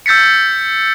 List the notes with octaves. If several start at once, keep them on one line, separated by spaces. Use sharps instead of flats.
E6 G6 A6 B6 C#7